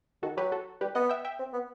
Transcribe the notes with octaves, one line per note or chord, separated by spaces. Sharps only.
D#3 F#4 A4
F#3 G4 B4
F#4 A4
G3 G4 B4
B3 D#5 F#5
E5 G5
E5 G5
C4
B3